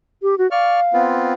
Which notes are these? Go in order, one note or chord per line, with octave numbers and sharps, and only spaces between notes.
G4
F#4
D5 F5 C#6 F6
B3 C4 F4